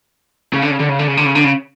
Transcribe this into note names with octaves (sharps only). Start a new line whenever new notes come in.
C#3
D3
C#3
D3
C#3
D3
C#3
D3
C#3
D3
C#3